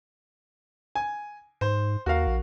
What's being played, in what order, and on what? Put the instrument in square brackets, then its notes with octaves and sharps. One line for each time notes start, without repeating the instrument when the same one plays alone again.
[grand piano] G#5
[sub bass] G#2 [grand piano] C5
[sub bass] D#2 [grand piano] F#4 A#4 F5
[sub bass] A#1